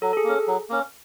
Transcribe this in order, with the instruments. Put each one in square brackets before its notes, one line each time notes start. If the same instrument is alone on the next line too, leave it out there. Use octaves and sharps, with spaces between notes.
[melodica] F#3 [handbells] A4
[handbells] A4
G#4
[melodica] A#3 C#4
F#3
A#3 C#4